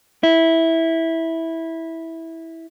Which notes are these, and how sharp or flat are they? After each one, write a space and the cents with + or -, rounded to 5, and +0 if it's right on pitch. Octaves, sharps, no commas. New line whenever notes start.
E4 -10